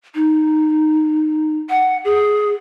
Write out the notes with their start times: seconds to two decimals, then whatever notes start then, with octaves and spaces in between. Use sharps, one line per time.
0.15 D#4
1.70 F#5
2.05 G#4